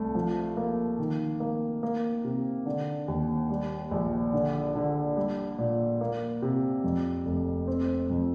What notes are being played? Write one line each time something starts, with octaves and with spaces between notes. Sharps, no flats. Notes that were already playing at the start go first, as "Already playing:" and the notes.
Already playing: C2 A3
F3
A#3
D#3
A#3
A#3
C3
D3
D#2
G3
A#1
D3
D3
G3
A#2
A#3
C3
F2
F1
C4
F2